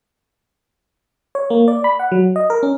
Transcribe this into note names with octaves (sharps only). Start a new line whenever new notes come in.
C#5
A#3
D5
B5
F#5
F#3
D#5
A#4
C#4